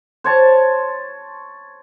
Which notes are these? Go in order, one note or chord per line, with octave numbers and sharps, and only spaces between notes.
C5 C#5 A5